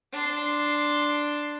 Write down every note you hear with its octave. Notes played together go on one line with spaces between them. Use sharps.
D4 C6